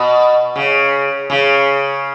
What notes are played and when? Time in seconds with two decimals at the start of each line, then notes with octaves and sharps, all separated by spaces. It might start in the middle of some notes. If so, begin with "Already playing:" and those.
Already playing: B2
0.56 C#3
1.30 C#3